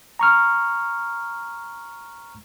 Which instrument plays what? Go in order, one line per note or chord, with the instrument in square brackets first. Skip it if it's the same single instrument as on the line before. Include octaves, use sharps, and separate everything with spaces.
[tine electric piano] A#5 C#6 F6